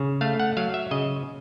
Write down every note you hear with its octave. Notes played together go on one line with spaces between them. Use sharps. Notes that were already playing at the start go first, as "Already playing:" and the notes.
Already playing: C#3
A3 F5
F#5
F#3 F5
E5
C#3 D#5